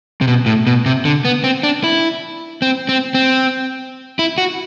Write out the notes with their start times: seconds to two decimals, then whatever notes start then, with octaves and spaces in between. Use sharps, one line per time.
0.21 C3
0.27 B2
0.46 A2
0.67 B2
0.86 C3
1.05 D3
1.25 B3
1.44 C4
1.63 D4
1.84 E4
2.62 C4
2.89 C4
3.14 C4
4.19 E4
4.38 F#4